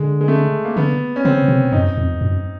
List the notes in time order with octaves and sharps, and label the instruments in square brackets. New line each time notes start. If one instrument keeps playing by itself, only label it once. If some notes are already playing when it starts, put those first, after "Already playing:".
Already playing: [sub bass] D3 [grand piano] G#3
[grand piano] G#3
A3
A#3
[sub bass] D3 [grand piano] B3
[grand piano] C#4
[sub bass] C#3 [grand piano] C4
[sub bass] C3
[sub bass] F#2 [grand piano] D#4
[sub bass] F2
F#2